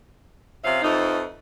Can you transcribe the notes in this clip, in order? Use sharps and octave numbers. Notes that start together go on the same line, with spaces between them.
C3 F3 C#4 E5 F5
F2 E3 F3 D#4